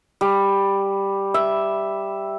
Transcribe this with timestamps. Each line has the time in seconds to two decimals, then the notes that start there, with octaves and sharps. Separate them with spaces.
0.21 G3
1.34 E5